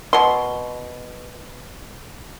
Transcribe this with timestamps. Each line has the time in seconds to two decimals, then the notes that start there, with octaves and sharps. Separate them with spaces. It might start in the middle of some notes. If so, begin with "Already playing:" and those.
0.13 B2 C6